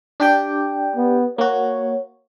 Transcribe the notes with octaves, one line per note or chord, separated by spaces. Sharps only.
D4 G4 G5
B3
A#3 F#4 C#5